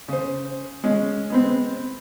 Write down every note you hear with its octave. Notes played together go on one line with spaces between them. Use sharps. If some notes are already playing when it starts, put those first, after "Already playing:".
C#3 C5
G#3 C#4
G#3 B3 C4